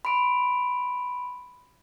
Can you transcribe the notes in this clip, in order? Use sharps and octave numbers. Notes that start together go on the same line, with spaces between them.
B5 C6 D7